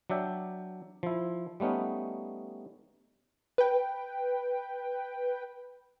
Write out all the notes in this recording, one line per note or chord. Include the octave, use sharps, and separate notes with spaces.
F#3 D4 D5 E5 G5
F3 E4
G3 A3 B3 C#4 D#4
B4 G5